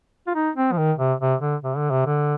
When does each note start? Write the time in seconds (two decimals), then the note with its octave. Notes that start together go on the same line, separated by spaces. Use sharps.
0.27 F4
0.35 D#4
0.56 C4
0.72 F3
0.78 D#3
0.99 C3
1.20 C3
1.41 D3
1.63 C3
1.77 D3
1.91 C3
2.06 D3